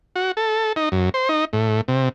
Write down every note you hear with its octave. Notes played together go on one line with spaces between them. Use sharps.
F#4
A4
D#4
F#2
C5
D#4
A2
C3